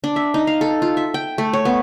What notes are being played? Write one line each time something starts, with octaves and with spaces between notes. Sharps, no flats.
D4
E5
D#4
F5
A4
F4
E5
G5
A3
C#5
B3